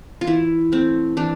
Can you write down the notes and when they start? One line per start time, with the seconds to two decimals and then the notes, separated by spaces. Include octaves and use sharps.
0.21 F4
0.27 E3 E4
0.72 A3 C4
1.17 E3 D4